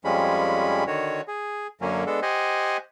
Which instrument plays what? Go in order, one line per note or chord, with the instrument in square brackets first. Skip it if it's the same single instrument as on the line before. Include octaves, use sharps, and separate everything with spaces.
[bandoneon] F2 F3 G3 G#3 C#4 B5
D3 D#3 F#4 C#5
G#4
F#2 D3 F#3 A#3 C#4
G#3 B3 D4 A4
G4 C5 D#5 F#5 G#5